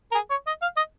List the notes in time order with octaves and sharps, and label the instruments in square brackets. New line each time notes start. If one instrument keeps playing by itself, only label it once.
[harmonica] A#4
G#4
C#5
D#5
F5
D#5